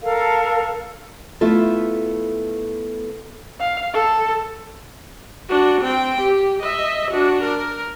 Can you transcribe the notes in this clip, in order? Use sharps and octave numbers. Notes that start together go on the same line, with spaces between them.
A4 A#4 F5
A3 B3 E4 F4 A4
F5
A4
D4 F#4
C4 G5
G4
D#5 E5
D4 F#4
A#4